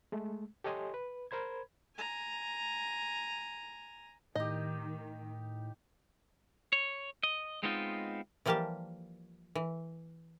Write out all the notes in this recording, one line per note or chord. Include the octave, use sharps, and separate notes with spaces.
G#3 A3
G4 A4 C#5 D#5 G#5 C6
B4
A#4 C5 B5 G#6
G#5 A#5
A2 D#3 D#4 G4 D#5
C#5
D#5
G#3 B3 C4 D#4 F4
E3 F3 G3 A#3 G4 A5
E3